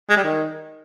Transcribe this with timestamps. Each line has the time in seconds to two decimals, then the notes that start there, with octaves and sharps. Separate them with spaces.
0.10 G#3
0.17 G3
0.24 D#3